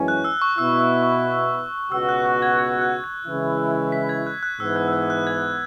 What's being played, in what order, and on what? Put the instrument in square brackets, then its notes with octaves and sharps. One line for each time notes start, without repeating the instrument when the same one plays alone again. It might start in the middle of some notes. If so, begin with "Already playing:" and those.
Already playing: [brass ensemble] F#2 E3 G#3 C#4 E4
[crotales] F#6
E6
C#6
[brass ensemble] B2 B3 E4 [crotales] E6
[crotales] E6
C#6
[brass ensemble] C#2 B2 B3 F#4 [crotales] E6
[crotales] F#6
F#6
G#6
G#6
F#6
G#6
[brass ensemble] C#3 E3 G#3 E4
[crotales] B6
G#6
F#6
F#6
[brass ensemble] G#2 E3 B3 [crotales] E6
[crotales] F#6
E6
F#6
F#6
G#6